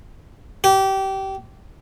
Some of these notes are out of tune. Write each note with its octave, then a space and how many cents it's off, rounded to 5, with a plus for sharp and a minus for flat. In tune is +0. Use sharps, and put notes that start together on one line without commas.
G4 -25